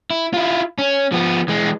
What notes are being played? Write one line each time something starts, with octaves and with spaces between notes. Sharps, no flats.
E4
E4 F4
C#4
F3 B3
E3 G#3